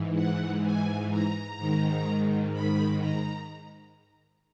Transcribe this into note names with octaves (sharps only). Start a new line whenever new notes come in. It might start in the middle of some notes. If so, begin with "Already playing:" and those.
Already playing: G#2 E3
F#5
G#5
A#5
G#2 D#3
B5
A#5